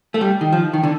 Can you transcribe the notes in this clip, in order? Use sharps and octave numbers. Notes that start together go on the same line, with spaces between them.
A3
G3
D#3
F3
D#3
D3